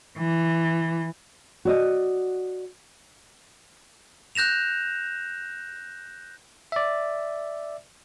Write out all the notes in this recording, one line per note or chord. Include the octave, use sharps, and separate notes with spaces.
E3
F#4 D5 D#5
F#6 G6 A#6 E7 F7
D5 E5